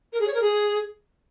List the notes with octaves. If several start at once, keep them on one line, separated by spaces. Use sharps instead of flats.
A#4
G#4
C#5
A#4
G#4